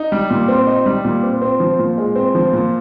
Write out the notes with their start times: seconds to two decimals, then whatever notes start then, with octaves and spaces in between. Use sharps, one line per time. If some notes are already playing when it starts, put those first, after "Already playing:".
Already playing: D#4
0.12 G3
0.31 A#2
0.48 C4
0.67 D#4
0.86 G3
1.05 A#2
1.23 C4
1.42 C4
1.60 F3
1.79 A#2
1.98 G#3
2.16 C4
2.35 F3
2.53 A#2